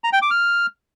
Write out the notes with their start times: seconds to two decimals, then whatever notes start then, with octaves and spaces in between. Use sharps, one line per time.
0.04 A#5
0.13 G5
0.22 D6
0.31 F6